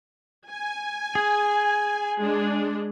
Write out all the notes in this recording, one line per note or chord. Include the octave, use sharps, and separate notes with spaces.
G#5
G#4
G#3 D4